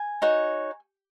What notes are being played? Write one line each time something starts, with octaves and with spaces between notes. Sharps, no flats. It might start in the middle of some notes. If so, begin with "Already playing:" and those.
Already playing: G#5
D#4 F#4 C#5